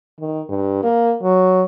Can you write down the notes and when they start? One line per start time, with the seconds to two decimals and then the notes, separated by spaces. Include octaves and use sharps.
0.20 D#3
0.49 G2
0.83 A#3
1.23 F#3